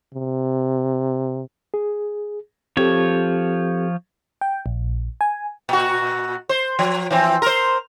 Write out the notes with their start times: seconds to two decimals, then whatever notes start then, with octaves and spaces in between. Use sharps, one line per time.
0.14 C3
1.74 G#4
2.77 F3 C4 G4 A4 C#5
4.41 G5
4.66 A#1
5.21 G#5
5.69 A#2 F#4
6.49 C5
6.79 F3
7.11 E3 F3 C4
7.42 A#4 C5